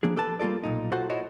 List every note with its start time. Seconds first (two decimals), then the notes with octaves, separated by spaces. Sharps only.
0.03 F3 A#3 D4 G#4
0.16 G4 A4 B4 A5
0.39 G3 A#3 F4 A4 D5
0.64 B1 A#2 D#4
0.92 F4 F#4 A4 C5 F#5
1.10 E4 F#4 A4 C5 C#5 D#5